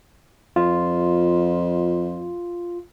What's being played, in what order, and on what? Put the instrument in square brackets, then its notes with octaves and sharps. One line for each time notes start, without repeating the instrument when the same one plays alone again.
[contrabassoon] F2 [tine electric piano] F4